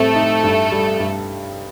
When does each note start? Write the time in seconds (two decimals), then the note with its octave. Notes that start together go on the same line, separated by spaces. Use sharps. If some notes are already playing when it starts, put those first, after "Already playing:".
Already playing: A2 G3 A3 C4 A4
0.15 D#4
0.43 G2
0.72 G3
1.00 G2